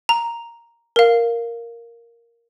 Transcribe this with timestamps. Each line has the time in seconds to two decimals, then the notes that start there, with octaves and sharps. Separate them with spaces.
0.09 A#5
0.96 A#4 F5